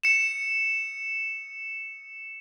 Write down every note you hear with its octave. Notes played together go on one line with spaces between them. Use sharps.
C#7 E7